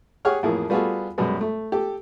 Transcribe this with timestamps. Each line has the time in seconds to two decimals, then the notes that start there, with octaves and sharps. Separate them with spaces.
0.25 G4 G#4 C#5 F#5 F6
0.43 A1 F2 F3 A#3 E4 G#4
0.70 G3 B3 F4 F#4 G#4 A4
1.18 F#2 B2 G3 G#3 B3
1.41 A3
1.72 G4 A4